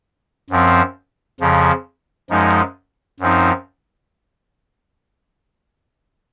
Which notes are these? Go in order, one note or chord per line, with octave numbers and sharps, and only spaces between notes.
F#2 F3 C4
F2 C#3 F3
F#2 F3 G#3 D#4
F#2 F3 C4 D#4